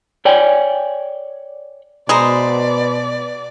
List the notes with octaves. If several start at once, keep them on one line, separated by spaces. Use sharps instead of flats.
C#5 D5 G5 G#5
B2 G#3 B4 C5 D5 A#5